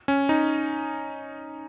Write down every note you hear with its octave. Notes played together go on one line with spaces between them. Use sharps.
C#4
D#4